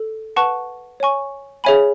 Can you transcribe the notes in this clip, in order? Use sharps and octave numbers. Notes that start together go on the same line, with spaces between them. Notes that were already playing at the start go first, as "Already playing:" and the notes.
Already playing: A4
B4 F#5 A5 C#6
C#5 G#5 C#6
G#4 C#5 E5 G#5 B5